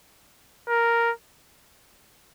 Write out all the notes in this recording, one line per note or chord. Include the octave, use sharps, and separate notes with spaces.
A#4